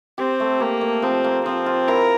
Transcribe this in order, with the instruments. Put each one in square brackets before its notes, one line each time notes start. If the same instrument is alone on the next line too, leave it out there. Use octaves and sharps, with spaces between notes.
[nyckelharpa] C4 [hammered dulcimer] G4
[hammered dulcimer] A3
[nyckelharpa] A#3 [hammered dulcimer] G4
[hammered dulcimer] A3
[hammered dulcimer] F3 [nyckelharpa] C4
[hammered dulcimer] A#3
[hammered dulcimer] F3 [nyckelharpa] C4
[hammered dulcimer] F4
[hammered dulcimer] E4 [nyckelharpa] A#4